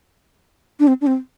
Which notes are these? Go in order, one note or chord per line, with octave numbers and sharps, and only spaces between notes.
D4
C4
D4
C4